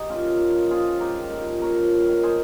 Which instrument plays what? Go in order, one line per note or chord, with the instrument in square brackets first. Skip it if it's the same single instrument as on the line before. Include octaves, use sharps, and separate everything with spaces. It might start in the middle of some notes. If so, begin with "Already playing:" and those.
Already playing: [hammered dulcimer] D#4 G4
A#2 C#4 F4
F3
A#2
F3
A#2 F4 G#4
F3
G#2 G4 A#4
D#3
A#2
F3
A#2 A#4 C#5
F3
G2
D#3
G#4 C5